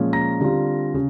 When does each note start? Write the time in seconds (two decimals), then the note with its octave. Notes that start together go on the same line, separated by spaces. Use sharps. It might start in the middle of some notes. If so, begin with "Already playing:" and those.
Already playing: A#2 F3 G#3 C#4
0.13 A#5 A#6
0.40 D3 G3 C4 F4
0.94 C#3